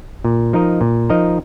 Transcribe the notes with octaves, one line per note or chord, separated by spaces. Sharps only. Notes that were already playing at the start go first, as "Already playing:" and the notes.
A#2
F3 D#4 A#4 D#5
A#2
F3 D#4 A#4 D#5